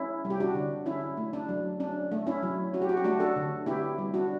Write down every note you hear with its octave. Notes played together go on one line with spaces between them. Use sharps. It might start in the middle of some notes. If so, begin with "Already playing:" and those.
Already playing: C#4 E4
G3
G4
D4 F#4
D3
C#4 E4
A3
D4
F#3
C#4 D4
A3
C#4 E4
F#3
C#4 F#4
G4
F#4
G4
A3 D4 F#4
F#4 A4
D3
B3 E4 G4
G3
D4 F#4